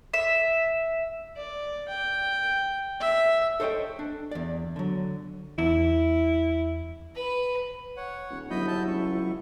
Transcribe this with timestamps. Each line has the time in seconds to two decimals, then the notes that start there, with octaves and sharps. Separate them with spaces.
0.14 E5
1.37 D5
1.89 G5
3.00 E5
3.60 A4 C5 C#5 D#5 G5
3.99 D4
4.31 E2 D5
4.76 D3 F#3
5.58 E2 E4
7.15 B4
7.97 C#5 F#5
8.30 D#1
8.51 G1 F#3 E4 D#5 B5 G6
8.67 A5 G6
8.88 C#2 C#6